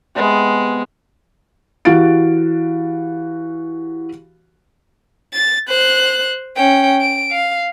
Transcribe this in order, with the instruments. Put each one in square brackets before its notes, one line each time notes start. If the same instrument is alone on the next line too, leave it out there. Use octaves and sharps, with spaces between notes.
[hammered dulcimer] C3 B3 [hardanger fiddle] G#3
[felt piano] E3 F#4 G4 F5 A6 D7
[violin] A6
C5 F#6
C#4 G5
D7
F5